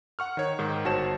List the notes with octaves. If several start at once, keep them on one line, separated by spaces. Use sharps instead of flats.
F#5 C#6 F6
D#3 C#5
G#2 D#3
G1 F#4 C5 C#5 A5 E7